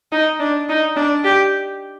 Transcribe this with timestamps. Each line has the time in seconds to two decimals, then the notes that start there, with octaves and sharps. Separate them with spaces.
0.12 D#4
0.40 D4
0.69 D#4
0.96 D4
1.24 G4